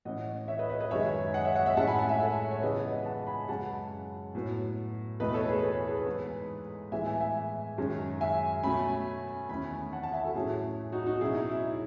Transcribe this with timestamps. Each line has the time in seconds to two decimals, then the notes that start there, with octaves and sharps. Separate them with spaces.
0.05 A2 E3 A3 C#4 D#5 F#5
0.48 C#5 E5
0.59 B4 D#5
0.70 B4 D#5
0.80 B4 D#5
0.91 F#2 D#3 G#3 C#5 E5
1.34 D#5 F#5
1.45 C#5 E5
1.55 D#5 F#5
1.66 C#5 E5
1.77 A2 G#3 C#4 F#5 A5
1.87 G#5 B5
1.98 F#5 A5
2.09 E5 G#5
2.20 A4 C#5
2.51 C#5
2.62 C#3 E3 G#3 B3 B4 D#5
2.77 D#5 F#5
2.91 D#5 F#5
3.05 F#5 A5
3.27 G#5 B5
3.48 F#2 C#3 G#3 C#4 F#5 A5
4.35 A2 F#3 B3
5.20 E2 B2 A3 B4 D#5
5.34 A4 C#5
5.49 G#4 B4
5.63 B4
5.75 C#5
5.88 G#4 B4
6.06 G#2 E3 B3
6.92 A2 E3 G#3 B3 E5 G#5
7.06 E5 G#5
7.20 E5 G#5
7.78 F#2 D#3 G#3 C#4
8.21 E5 G#5
8.63 B2 A3 C#4 G#5 B5
9.49 E2 D#3 A3 C#4 G#5 B5
9.92 F#5 A5
10.03 F#5 A5
10.13 E5 G#5
10.24 F#4 A4
10.35 A2 F#3 C#4 E4 G#4
10.92 D#4 F#4
11.07 D#4 F#4
11.21 B2 F#3 C#4 E4 G#4
11.35 D#4
11.50 E4